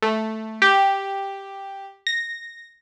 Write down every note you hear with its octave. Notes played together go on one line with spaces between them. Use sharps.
A3
G4
A#6